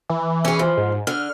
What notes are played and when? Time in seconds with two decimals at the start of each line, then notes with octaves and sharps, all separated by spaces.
0.10 E3
0.45 C#4 G#4
0.59 F3
0.77 G#2
1.07 D3 F6